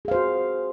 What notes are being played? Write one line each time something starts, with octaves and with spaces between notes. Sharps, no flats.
F#4 G#4 C5 F5